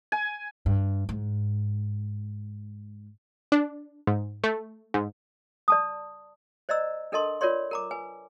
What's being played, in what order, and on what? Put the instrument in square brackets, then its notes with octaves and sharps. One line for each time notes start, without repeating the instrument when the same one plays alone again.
[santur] G#5
[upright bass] G2
G#2
[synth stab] D4
G#2
A3
G#2
[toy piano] D5 A5 D#6
C5 D5 D#5 A#5 E6
D4 A4 A#4 D#5 A5 C6
F4 A#4 C#5 D5 C6
A#4 A#5 D6
B4 G#5